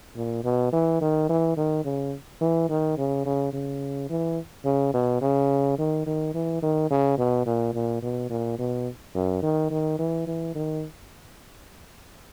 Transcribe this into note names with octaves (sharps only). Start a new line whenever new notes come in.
A#2
B2
E3
D#3
E3
D#3
C#3
E3
D#3
C#3
C#3
C#3
E3
C#3
B2
C#3
D#3
D#3
E3
D#3
C#3
B2
A#2
A#2
B2
A#2
B2
F#2
D#3
D#3
E3
E3
D#3